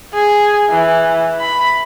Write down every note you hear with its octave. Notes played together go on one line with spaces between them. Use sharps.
G#4
E3
B5